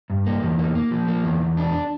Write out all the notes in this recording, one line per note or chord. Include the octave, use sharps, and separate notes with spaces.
G2
A#3
E2
A#3
A#3
F3
A#3
E2
E2
D4